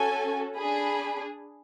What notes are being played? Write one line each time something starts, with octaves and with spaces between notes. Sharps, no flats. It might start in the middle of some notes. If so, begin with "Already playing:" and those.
Already playing: C#4 F#4 A4 G#5
D4 G#4 B5